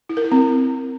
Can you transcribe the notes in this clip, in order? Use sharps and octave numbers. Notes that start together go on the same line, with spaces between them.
E4
A#4
E4
C4